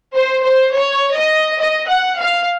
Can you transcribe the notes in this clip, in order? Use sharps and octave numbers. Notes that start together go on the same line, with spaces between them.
C5
C5
C#5
D#5
D#5
F#5
F5